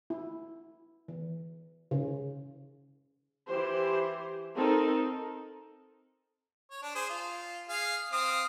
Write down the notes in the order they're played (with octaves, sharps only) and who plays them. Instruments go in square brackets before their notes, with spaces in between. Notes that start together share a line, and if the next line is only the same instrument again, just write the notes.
[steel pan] E4
E3
C#3
[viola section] E3 G4 C5
C4 D#4 A4 A#4
[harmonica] C#5
D4
G#4 C5
F4
G#4 F5
C4 F5 D#6